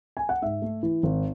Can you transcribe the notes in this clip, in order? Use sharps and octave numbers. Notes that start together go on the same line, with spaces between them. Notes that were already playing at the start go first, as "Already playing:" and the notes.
G#5
F#5
G#2 E5
A3
E3
G#1